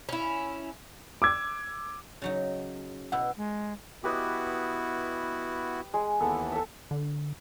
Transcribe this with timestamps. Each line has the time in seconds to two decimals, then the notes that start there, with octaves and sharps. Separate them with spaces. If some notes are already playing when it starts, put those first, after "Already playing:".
0.09 C#4 E4
1.22 D6 E6 G#6
2.22 C#3 F#3 D#4
3.12 B2 E4 F#5 E6
3.37 G#3
4.04 B3 E4 F#4 G4 B4 D#5
5.94 G#3
6.20 D#2 E3 B3 A4
6.52 A4 E5
6.91 D3